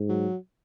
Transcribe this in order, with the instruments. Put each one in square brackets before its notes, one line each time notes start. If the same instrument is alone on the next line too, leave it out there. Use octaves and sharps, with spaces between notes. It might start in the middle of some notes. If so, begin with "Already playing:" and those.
Already playing: [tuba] G#2
[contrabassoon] F#3